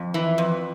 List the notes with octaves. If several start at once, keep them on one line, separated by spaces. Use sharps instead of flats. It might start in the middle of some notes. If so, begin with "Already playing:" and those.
Already playing: F2
E3
F2